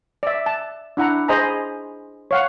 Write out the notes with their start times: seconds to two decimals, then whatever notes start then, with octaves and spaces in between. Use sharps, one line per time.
0.23 D5 E5
0.46 A5
0.97 D4 E4 F#5 A#5
1.28 G#4 C5 D#5 G#5 A#5 B5
2.31 C#5 F5 F#5